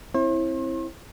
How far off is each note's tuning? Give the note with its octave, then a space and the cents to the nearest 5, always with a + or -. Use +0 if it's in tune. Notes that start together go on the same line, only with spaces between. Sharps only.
C4 +10 E4 +0 C5 +45